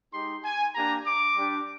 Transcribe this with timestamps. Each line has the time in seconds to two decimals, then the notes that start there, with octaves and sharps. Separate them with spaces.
0.13 G#3 D#4 G4 C6
0.44 G#5
0.74 A#3 D4 G4 A#5
1.05 D6
1.36 G3 D4 G4